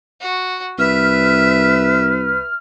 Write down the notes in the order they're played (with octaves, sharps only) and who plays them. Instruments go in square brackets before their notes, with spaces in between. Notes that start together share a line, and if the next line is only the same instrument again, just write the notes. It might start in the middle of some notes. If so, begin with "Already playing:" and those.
[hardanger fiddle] F#4
[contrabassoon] C2 [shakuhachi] B4 [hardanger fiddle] E5 [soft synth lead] F6